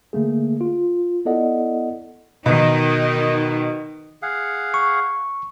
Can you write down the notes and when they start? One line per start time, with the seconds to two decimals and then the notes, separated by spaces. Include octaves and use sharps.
0.13 D3 A3 A#3 G#4
0.61 F4
1.25 B3 E4 A4 D5 D#5 F#5
2.46 B2 D#3 D#4
4.22 G#4 F5 F#5
4.74 C#6